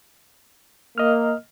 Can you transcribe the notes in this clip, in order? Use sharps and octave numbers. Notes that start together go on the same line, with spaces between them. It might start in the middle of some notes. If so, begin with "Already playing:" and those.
A#3 D#5 F6